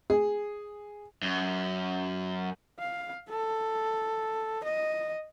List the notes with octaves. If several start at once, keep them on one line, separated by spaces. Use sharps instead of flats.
G#4
F#2
F5
A4
D#5